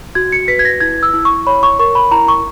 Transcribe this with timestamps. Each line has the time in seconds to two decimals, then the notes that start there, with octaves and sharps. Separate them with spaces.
0.15 F#4 G#6
0.32 C#7
0.48 B4 B6
0.59 G#6
0.65 A#6
0.81 E4 G#6
1.03 E6
1.13 E4
1.25 C#6
1.47 C#5 B5
1.63 C#6
1.79 A#4 C#6
1.95 B5
2.11 E4 A#5
2.28 C#6